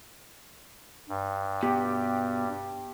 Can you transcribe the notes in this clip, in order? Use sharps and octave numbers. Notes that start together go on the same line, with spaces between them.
G2
B2 G4